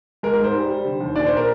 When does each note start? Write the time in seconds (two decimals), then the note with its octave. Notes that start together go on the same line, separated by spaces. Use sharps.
0.23 G#3 A#4
0.33 A#4
0.39 G#2 C5
0.54 G3
0.70 G3
0.85 D3
1.01 D#2
1.16 A#2 D4 D5
1.26 C5
1.31 A#2
1.37 A#4